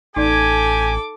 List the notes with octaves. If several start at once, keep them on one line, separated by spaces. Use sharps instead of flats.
A1 D#4 G4 A4 D5 G#5 D6